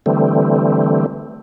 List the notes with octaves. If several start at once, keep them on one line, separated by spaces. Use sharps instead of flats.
D3 E3 G3 A3 C4